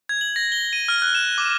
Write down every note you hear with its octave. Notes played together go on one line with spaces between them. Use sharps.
G#6
F#7
A#6
G7
D#7
F6
F#6
E7
D6